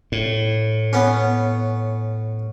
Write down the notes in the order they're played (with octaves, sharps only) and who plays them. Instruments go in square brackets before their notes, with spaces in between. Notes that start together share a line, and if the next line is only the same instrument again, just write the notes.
[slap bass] A2
[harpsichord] B3 C#4